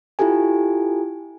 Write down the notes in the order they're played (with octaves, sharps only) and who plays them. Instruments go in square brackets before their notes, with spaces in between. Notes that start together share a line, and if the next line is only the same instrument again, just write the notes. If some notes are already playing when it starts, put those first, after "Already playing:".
[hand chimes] E4 F4 G4 A4 G#5